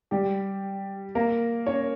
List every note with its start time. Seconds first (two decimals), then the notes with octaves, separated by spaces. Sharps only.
0.11 G3 G4
1.15 A#3 A#4
1.66 C#4 C#5